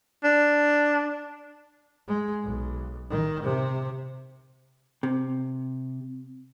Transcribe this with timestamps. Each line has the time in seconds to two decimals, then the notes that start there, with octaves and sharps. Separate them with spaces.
0.24 D4
2.08 G#3
2.44 B1
3.10 D#3
3.43 C3
5.03 C3